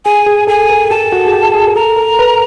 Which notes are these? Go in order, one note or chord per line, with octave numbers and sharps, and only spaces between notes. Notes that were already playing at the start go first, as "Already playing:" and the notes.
G#4 G#5
G#4
A4 G#5
A#4
G4 A5
F#4
G#4
G4
G#4
A#4
A4 A#5
A#4
B4